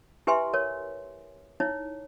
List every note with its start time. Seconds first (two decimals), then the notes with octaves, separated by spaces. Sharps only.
0.27 E4 G4 B4 E5 G#5 C6
0.54 A#4 C#5
1.60 D#4 E4 C#5